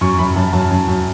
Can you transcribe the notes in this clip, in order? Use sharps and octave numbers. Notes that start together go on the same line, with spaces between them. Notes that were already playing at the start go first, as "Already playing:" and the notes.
F#2 C#6
F#2 B5
F#2 A5
F#2 A5
F#2
F#2